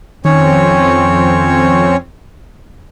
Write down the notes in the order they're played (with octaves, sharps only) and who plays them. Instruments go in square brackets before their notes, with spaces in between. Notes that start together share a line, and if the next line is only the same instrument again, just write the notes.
[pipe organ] F2 C4 [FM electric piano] D#3 [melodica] C#4 C#5